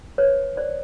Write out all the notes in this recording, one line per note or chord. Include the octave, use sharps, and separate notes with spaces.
B4 C#5
C5 D5